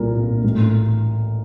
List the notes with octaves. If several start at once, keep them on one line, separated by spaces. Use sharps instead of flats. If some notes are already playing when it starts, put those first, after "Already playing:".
Already playing: C2 A#2 A#4
A#2
A1